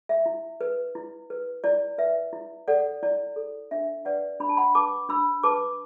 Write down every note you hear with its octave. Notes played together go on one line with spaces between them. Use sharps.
E5
E4
B4
E4
B4
E4 D5
B4 E5
E4
A4 D5 F#5
E4 D5
A4
D4 E5
B4 D5 F#5
D4 B5
A5
F#5 B5
B4 A5 D6
D4 B5 E6
B4 A5 D6